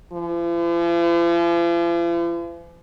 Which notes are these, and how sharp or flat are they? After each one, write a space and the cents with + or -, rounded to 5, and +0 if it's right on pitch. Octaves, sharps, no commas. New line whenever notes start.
F3 -45